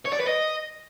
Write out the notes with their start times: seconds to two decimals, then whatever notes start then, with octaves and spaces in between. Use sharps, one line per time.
0.06 C#5
0.13 D5
0.20 B4
0.27 D#5